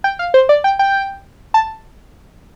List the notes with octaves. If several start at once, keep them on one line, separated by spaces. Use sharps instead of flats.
G5
F5
C5
D5
G5
G5
A5